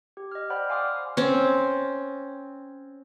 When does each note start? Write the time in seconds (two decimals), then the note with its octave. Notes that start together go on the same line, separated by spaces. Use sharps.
0.17 G4
0.31 D#5 F6
0.50 C5 D5 F#5 G5 B5 F6
0.70 F5 G#5 C6 D6 D#6 F6
1.17 C4 C#4